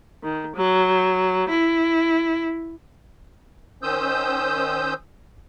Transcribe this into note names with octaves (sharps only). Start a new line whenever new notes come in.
D#3
F#3
E4
D#3 C#4 C5 D#6 E6 G6